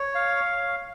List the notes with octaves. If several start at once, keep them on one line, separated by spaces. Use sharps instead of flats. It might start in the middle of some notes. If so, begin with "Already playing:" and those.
Already playing: C#5
F5